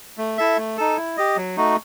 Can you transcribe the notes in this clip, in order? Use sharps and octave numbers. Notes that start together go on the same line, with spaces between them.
A3
E4 A4 E5
A3
D#4 A4
E4
G4 D#5
F#3
A3 D#4 F#4